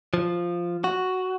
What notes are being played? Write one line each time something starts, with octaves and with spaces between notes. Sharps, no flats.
F3
F#4